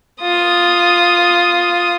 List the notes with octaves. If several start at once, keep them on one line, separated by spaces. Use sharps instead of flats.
F4 D#6